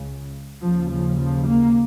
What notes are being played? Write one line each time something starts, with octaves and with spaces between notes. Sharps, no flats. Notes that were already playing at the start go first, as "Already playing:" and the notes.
Already playing: C#2 C#3
D#2 C#3 F3
F3
F3
A#3